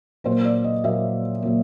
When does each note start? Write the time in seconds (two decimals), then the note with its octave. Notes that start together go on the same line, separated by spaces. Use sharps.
0.24 A#2 F#3 A#3 C5
0.45 D5
0.64 D#5
0.84 A#2 F#3 A#3 E5
1.42 A#2 F#3 A#3